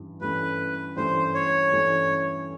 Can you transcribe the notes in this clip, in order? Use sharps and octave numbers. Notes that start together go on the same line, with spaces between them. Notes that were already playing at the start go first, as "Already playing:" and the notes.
Already playing: G2 E3 C#4
G2 E3 A3 C#4 B4
G2 E3 A3 C#4 C5
C#5
G2 E3 A3 C#4